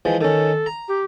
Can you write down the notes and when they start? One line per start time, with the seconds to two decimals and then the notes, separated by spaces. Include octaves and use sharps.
0.05 E3 F3 G#3
0.21 D#3 C#4 A4
0.66 A#5
0.88 G4